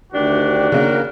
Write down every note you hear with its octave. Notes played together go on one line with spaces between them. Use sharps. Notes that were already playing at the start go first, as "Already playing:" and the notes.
D2 D#3 D4 F#4 G4
C#3 A#3 A#4